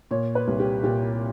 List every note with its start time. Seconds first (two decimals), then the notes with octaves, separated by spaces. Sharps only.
0.11 A#2 C#5
0.35 B4
0.47 C2
0.60 G4
0.83 A#2 G4